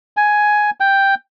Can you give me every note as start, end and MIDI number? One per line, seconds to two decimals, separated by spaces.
0.17 0.70 80
0.80 1.15 79